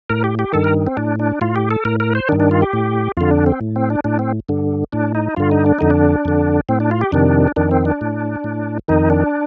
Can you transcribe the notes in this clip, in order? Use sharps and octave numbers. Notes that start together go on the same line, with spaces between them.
A2 A#4
G4
G4
G2 D#3 A4
A#4
C4
A2 D4
D4
A2 F4
G4
A4
A2 A#4
A#4
C5
G2 D#3 D4
D4
F4
G4
A2
F2 D3 F4
D4
C4
A2
C4
D4
A2 D4
C4
G2 D3
A2 D4
D#4
G2 D3 F4
D#4
D4
F2 D3 D#4
D4
F2 D3
A2 C4
D4
F4
G4
F2 C3 D#3 D4
F2 D#3 D4
C4
D4
A2
A2
F2 D#3 D#4
D4